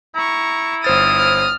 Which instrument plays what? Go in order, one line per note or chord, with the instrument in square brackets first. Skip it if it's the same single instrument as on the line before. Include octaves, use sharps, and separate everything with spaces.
[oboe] E4 [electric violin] A#5 C#6
[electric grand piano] G1 C5 A6 [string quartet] D#6 [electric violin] F6
[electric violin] F6